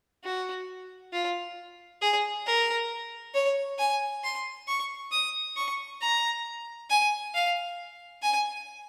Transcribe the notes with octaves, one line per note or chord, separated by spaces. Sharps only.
F#4
F4
G#4
A#4
C#5
G#5
C6
C#6
D#6
C#6
A#5
G#5
F5
G#5